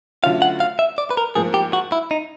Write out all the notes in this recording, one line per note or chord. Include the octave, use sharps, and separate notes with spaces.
D3 F#3 A3 C#4 F4 F5
F#5
F5
E5
D5
B4
A#4
G#2 F3 A#3 G#4
G4
F#4
E4
D#4